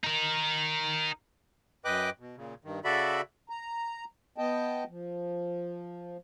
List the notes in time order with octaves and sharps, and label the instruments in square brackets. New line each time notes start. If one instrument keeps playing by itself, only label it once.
[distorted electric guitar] D#4 A#4
[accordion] F#2 B4 D#5 G5 D6 F#6
B2
A#2 C#3
G2 D#3
C#3 F#4 A4 D5 E5 B5
[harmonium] A#5
B3 D#5 G5 A5
F3